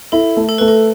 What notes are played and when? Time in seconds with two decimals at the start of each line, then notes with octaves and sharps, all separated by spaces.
0.12 E4 A4
0.37 A3
0.49 A4
0.58 A3 B4
0.68 A4